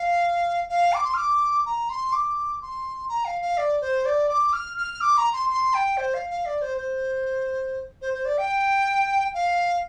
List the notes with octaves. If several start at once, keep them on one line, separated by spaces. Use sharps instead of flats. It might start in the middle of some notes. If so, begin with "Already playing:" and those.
Already playing: F5
F5
D6
C6
F6
D6
A#5
C6
D6
C6
A#5
F5
F5
D5
C5
D5
D6
F6
F6
D6
A#5
C6
C6
G5
C5
F5
F5
D5
C5
C5
C5
C5
D5
G5
F5